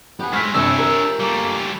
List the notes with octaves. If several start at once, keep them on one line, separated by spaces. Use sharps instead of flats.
B3 G4 G#5
G#2 G#3 A3 F6 B6
G1 C3 D4 C#5 E5 E6
A#4
G3 A3 A#3